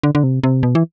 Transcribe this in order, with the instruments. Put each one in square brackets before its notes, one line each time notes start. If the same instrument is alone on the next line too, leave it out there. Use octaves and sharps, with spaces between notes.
[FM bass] D3
D3
C3
C3
B2
E3